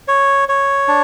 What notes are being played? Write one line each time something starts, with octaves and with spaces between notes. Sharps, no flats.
C#5
C#5
D4